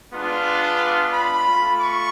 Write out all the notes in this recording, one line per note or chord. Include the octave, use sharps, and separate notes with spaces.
G#3 B3 D4 F4
B5
A3 F4
C#6